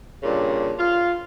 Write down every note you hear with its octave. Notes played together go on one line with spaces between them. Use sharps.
G2 A#2 C#3
F4